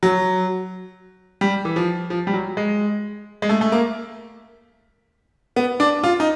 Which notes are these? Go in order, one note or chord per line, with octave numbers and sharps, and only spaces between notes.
F#3
G3
E3
F3
F3
G3
F#3
G#3
G#3
A3
A3
A#3
B3
D4
F4
D#4